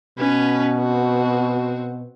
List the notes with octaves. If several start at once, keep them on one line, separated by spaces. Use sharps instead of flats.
B2 C#4 B4
C4 F#4